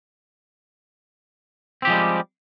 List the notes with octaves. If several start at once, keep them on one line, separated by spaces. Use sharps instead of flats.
F3 G3 G#3 C4 G4